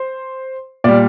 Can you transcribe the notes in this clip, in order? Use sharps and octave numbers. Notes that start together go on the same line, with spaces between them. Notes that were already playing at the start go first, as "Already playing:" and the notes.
Already playing: C5
A#2 G3 D5